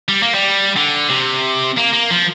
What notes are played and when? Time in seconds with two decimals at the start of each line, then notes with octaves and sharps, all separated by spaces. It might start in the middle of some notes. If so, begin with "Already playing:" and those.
0.09 G3
0.22 A#3
0.35 G3
0.76 D3
1.10 C3
1.77 A#3
1.93 A#3
2.10 F3